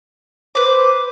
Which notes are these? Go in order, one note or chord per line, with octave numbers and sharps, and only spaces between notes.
B4 C5 D6